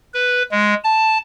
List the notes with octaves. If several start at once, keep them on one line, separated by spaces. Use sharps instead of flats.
B4
G#3
A5